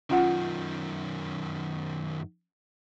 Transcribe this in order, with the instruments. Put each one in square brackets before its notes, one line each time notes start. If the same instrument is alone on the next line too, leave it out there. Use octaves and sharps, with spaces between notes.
[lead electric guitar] F#2 D#3 [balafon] C#4 F4 F#5